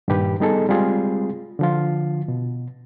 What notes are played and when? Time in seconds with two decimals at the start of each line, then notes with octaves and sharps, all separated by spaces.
0.08 G2 A#2 D#3 G4 B4
0.40 G3 B3 D#4 G#4 A4 D#5
0.69 G3 G#3 C4 F4 G#4
1.59 D3 F3 F4
2.28 B2